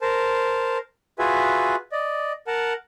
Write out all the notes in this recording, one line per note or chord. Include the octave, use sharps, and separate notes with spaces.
A#4 C5 A5
F4 F#4 G#4 B4 E5 G#5
D5 D#5
A#4 F#5 A5